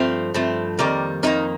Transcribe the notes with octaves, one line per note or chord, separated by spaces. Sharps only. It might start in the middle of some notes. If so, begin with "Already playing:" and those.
Already playing: G2 F3 A3 C4
G2 F3 A3 C4
F2 D#3 G3 A#3 A#4 D5
F2 D#3 G3 A#3 D#4